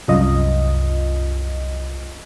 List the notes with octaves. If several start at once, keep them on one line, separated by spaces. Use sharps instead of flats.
C2 F#2 F4 D#5